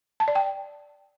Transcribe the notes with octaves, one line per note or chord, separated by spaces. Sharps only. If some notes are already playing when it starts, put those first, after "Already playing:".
A5
D5
G5